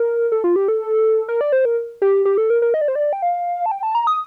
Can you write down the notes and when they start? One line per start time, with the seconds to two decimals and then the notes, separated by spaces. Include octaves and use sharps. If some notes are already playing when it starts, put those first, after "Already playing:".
Already playing: A#4
0.32 A4
0.44 F4
0.56 G4
0.68 A4
1.29 A#4
1.41 D5
1.52 C5
1.65 A#4
2.02 G4
2.25 G4
2.38 A4
2.50 A#4
2.62 A#4
2.74 D#5
2.81 D5
2.88 C5
2.95 D5
3.13 G5
3.22 F5
3.66 A5
3.71 G5
3.83 A5
3.95 A#5
4.07 D#6